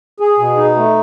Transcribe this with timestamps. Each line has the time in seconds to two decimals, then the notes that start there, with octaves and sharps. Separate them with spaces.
0.20 G#4
0.39 B2
0.57 D#4
0.76 A3